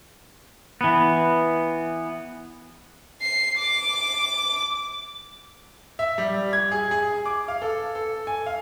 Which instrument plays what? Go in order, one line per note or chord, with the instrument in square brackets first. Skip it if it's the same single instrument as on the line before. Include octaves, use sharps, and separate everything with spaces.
[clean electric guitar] E3 B3
[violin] C7
D6
[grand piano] E5
G3
G#6
G#4
G#4
D6
F5
A4
A4
G#5
F5